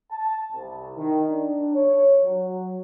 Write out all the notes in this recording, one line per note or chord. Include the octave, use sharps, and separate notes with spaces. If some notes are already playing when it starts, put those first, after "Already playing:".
A5
C2
D#3
D4
C#5
F#3